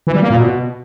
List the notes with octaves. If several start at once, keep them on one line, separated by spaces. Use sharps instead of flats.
E3
G3
A#3
A#2
B2